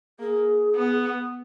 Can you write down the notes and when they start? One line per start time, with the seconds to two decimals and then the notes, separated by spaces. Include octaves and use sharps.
0.19 A#3 G#4
0.75 B3